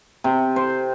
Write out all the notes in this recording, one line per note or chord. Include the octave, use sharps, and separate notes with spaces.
C3
C5